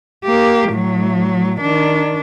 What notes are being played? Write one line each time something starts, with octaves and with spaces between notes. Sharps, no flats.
A#3 G4
A2 F#3
D#3 D4